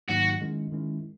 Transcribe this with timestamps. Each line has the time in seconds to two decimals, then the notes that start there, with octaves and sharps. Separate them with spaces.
0.09 G#2 D#3 F#3 A#3 D#4 F#4
0.41 D#3 G#3 C#4 E4
0.72 D#3 G#3 C#4 E4